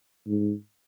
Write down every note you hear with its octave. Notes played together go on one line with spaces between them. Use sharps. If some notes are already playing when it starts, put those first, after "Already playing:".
G#2